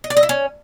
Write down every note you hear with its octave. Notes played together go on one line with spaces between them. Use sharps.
D#5
D5
D#5
E4
C#4